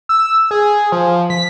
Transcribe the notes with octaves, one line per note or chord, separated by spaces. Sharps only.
E6
G#4
F3
B6